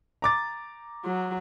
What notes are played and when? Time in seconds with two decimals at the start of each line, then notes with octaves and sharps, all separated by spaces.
0.22 A#5 D6 A6
1.04 F#3